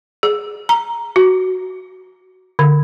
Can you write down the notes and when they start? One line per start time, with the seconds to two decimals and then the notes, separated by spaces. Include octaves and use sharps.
0.23 G#4
0.69 A#5
1.16 F#4
2.59 D3